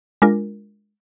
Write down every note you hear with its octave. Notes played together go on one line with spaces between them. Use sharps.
G#3 D4 F4 A#4